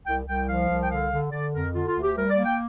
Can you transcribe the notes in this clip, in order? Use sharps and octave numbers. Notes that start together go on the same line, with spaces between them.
C2 G5
C2 G5
F3 F5
C2
G5
D3 F5
D3
D3 D5
F2 A#4
D3 F4
F4
D2
G4
G3 A#4
D5
A#3
G5